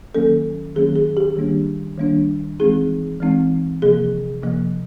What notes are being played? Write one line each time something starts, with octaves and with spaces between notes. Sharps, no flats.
D#3 F#3 A#3 C#4 A4
D#3 F#3 A#3 C#4 G#4
G#4
G4
D#3 G3 A#3 D4
D#3 G3 A#3 D4
E3 G#3 C4 D#4 G#4
E3 G#3 C4 D#4
C3 F3 A#3 G#4
C3 F3 A#3